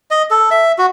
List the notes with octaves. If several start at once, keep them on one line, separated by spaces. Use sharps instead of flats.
D#5
A4
E5
F#4